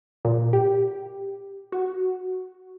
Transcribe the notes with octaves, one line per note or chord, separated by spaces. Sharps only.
A#2
G4
F#4